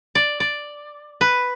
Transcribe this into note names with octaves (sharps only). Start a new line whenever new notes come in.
D5
D5
B4